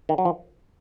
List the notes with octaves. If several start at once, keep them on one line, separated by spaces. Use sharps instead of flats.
D#3
F#3
F3